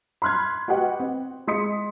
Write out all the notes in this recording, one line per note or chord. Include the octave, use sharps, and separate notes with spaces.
B5 C6 F6 F#6 G#6
F#4 G4 B4 D#5 F#5 G5
C4
G#3 C6 D#6 B6 C#7